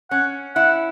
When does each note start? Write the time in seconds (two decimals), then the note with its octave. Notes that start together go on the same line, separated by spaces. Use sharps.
0.10 C#4 F#5
0.55 E4 F#5